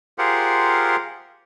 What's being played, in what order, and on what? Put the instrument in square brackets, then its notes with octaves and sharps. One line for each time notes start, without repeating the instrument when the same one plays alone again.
[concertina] F4 G4 G#4 A#4 C5 F#5